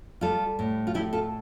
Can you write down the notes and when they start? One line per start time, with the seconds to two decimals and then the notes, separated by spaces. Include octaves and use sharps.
0.21 G3 F4 A4
0.59 A2
0.87 F4
0.94 A2 E4 G4
1.13 F4 A4